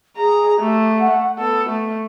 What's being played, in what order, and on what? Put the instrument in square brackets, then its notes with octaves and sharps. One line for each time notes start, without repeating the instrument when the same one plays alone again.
[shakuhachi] G#4 [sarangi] A#5
[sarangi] A3 [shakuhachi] G4
[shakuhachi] F#5
[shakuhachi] B3 [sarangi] A4
[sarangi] A3